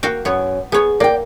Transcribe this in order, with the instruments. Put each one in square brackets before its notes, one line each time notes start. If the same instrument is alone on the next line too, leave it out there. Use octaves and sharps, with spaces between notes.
[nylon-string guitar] A#3 [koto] F#4 F5 G5
[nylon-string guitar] F#2 [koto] B3 C#5
[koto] B3 C#5 [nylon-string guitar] G#4
[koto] A#3 [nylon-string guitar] D5 G5